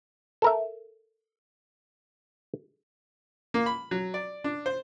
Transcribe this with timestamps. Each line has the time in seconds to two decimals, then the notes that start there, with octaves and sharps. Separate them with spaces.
0.42 A4 A#4 E5
3.54 A#3
3.66 B5
3.91 F#3
4.14 D5
4.44 D4
4.66 C5